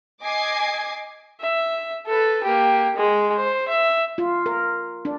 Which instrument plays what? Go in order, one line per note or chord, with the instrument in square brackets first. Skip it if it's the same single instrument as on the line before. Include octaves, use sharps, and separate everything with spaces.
[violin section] D#5 G#5 D6 G#6 C7
[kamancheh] E5
A4 B4
A#3 G4
G#3
C5
E5
[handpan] F4
A#4
D4